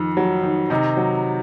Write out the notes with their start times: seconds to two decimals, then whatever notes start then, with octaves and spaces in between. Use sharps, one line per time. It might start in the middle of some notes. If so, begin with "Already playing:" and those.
Already playing: F2 D#3
0.17 F#3
0.43 D#3
0.70 C3 D#3 D#4
0.97 F#3